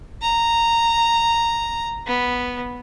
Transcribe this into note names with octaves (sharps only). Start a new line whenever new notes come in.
A#5
B3